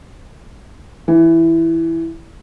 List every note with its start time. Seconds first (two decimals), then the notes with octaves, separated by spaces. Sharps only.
1.08 E3